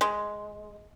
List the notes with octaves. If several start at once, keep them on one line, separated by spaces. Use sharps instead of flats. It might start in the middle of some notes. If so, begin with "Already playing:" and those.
G#3